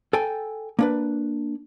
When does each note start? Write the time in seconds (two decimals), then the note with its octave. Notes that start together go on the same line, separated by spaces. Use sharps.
0.13 A4 G5 G#5
0.79 A#3 D4 B4